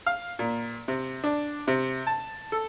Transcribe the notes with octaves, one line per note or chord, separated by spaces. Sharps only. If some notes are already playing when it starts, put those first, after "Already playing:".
F5
A#2
C3
D4
C3
A5
A4